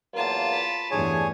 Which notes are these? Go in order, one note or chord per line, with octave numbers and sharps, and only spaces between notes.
E2 F#3 A#3 F4 A5
B5
E2 G2 G3 A3 D4 G#4 C#5 G#5